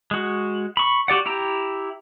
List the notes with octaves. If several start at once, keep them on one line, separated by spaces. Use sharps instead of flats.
G#3 F#4
B5 C#6
F#4 G4 D5 F#5
E4 G4 G5 A#5